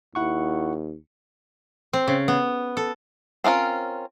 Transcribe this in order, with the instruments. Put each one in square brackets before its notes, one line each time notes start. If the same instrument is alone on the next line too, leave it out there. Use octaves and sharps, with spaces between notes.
[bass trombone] D#2 [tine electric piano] E4 F#5 C#6
[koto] C4
C#3
B3
A4
[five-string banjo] C4 C#4 F4 A#4